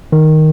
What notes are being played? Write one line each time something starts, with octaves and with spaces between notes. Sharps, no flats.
D#3